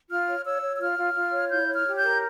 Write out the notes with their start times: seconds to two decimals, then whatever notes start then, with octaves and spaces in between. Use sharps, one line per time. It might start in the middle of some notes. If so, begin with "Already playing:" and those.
0.10 F4 F6
0.28 C#5
0.45 C#5 E6
0.62 C#5
0.75 E6
0.81 F4 F6
0.98 F4
1.15 F4
1.33 C#5
1.50 E4 G6
1.68 C#5
1.74 F6
1.85 G4
1.97 G6
2.03 A#4